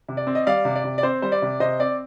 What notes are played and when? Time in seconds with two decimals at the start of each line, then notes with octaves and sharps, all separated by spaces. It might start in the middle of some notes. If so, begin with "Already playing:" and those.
0.08 C3
0.17 D5
0.27 C4
0.35 D#5
0.47 G3 D5 F5
0.65 C3
0.76 D5
0.84 C3
0.98 D5
1.03 C4 C5
1.22 G3 C5
1.32 D5
1.42 C3
1.60 C3 C5 D#5
1.80 C4 D5